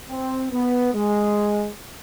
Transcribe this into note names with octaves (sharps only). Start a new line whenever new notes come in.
C4
B3
G#3